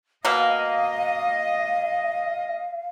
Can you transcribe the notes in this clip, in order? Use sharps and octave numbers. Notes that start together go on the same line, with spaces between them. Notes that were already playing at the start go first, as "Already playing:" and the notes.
B2 A#3 D#5 F5